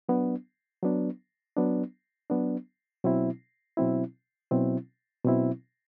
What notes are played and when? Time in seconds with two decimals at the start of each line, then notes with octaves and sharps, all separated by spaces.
0.09 F#3 B3 D4
0.83 F#3 B3 D4
1.57 F#3 B3 D4
2.30 F#3 B3 D4
3.04 B2 F#3 C4 E4
3.77 B2 F#3 C4 E4
4.51 B2 F#3 C4 E4
5.25 B2 F#3 C4 E4